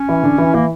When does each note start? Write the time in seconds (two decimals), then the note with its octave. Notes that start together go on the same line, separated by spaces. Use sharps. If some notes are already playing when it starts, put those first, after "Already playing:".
Already playing: C#4
0.09 E3 E4
0.23 D3 D4
0.38 E3 E4
0.54 E3 A#3 E4